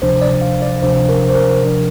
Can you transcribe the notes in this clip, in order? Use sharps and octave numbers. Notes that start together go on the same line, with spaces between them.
D2 C3 F3 D4 C5
D5
F5
D5
D2 C3 F3 D4 C5
A#4
C5
A#4
C3 F3 D4